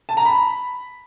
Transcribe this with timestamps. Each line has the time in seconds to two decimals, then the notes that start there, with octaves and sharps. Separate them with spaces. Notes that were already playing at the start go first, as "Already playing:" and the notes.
0.09 A5
0.17 A#5
0.25 B5